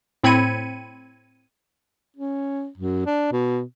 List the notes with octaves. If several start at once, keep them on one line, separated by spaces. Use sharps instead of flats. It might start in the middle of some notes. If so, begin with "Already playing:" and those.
A2 C4 B5 G#6 C#7 D#7
C#4
F#2
D4
B2